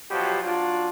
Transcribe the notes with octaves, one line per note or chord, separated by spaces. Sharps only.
B2 F3 F#3 G4
F#3 D4 F4